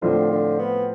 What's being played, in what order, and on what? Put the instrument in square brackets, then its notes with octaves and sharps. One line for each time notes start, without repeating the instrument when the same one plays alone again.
[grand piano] A2 F3 C4 F4 C5 [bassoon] D3
[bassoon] D3
B3